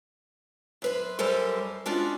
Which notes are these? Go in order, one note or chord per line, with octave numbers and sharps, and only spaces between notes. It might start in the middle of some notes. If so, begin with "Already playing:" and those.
F#2 B4 C5
F#2 G3 A4 A#4 C5 G#5
G#3 C#4 D4 F4 F#4 D#5